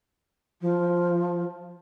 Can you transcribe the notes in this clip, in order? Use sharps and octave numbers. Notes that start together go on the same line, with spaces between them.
F3